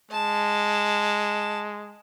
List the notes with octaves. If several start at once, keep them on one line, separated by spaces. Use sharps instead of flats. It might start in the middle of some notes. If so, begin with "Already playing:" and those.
G#3 A5